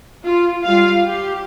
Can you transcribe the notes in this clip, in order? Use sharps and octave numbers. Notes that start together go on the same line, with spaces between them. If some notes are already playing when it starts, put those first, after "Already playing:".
F4
G3 F4 F5
G4